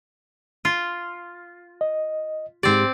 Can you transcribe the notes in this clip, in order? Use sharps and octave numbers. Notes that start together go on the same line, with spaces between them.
F4
D#5
G#2 C4 G4 D5